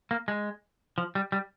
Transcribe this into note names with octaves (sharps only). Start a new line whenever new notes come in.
A#3
G#3
F3
G3
G3